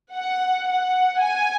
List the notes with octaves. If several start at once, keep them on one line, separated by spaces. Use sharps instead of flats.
F#5
F#5
G#5